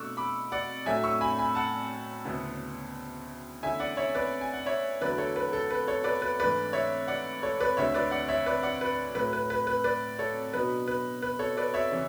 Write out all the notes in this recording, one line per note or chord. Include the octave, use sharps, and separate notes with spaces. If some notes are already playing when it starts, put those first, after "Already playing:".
Already playing: B2 A3 D4 C#6 D6 E6 F#6
B5 D6
D5 F#5
A2 F#3 A3 D4 E5 G#5
C#6 E6
G#5 B5
G#5 B5
F#5 A5
D2 C#3 G#3 B3 E4
E2 D3 A3 C#4 E4 E5 G#5
D5 F#5
C#5 E5
B4 D5
G#5
F#5
C#5 E5
E2 D3 F#3 A3 E4 B4 D5
A4 C#5
B4
A4
B4
A4 C#5
B4 D5
B4
G#2 E3 A3 D4 B4 D5
C#5 E5
D5 F#5
A4 C#5
B4 D5
D2 D3 G#3 C#5 E5
B4 D5
D5 F#5
C#5 E5
B4 D5
D5 F#5
B4
A2 F#3 A3 E4 B4
B4
B4
B4
B4 D5
A4 C#5
B2 F#3 B3 D4 B4
B4
B4
A4 C#5
B4 D5
C#5 E5
C#3 E3 G#3